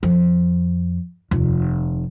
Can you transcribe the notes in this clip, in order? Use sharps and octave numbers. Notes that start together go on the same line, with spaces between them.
F2
F1 D#2